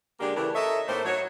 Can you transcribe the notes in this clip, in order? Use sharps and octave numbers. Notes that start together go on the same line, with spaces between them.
D3 G#3 A#3 D4 G4
C#3 E3 A3 D4 G4 A#4
A4 A#4 C#5 D#5 E5
A2 A3 A#3 D#4 C5
F#3 C#5